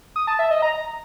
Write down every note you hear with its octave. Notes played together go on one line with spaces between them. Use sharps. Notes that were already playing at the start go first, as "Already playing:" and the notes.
D#6
A5
E5
D#5
A#5